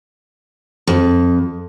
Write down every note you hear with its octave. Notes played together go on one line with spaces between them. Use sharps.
F2